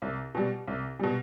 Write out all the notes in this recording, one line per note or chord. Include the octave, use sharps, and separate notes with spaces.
C2
B2 G3
C2
B2 G3